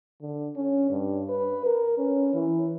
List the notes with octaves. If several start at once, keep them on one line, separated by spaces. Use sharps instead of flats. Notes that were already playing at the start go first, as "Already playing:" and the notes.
D3
C#4
G2
B4
A#4
C#4
E3